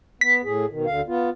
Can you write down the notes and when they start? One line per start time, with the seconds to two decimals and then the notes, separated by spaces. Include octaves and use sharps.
0.21 B3 B6
0.44 A2 G#4
0.70 B2 D#3
0.86 D2 D3 F5
1.07 B3 F4